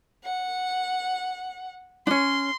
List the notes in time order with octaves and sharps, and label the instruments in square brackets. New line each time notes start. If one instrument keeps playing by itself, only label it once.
[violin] F#5
[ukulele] C#4 D4 [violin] C6